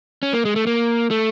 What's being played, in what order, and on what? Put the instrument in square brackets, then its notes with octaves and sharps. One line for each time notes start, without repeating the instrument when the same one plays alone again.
[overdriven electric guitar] C#4
A#3
G#3
A3
A#3
A3